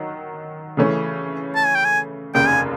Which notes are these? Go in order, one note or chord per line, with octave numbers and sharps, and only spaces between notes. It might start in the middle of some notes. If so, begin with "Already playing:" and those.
Already playing: D#3 F#3
C#3 E3 A3 C#4
A5
G#5
G5
G#5
F1 D#2 C#3 G5
G#5